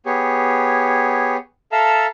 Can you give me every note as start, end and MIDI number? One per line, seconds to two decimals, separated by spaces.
0.06 1.37 59
0.06 1.37 67
0.06 1.37 68
0.06 1.37 73
1.72 2.07 69
1.72 2.07 76
1.72 2.07 77
1.72 2.07 81
1.72 2.07 82
1.72 2.07 88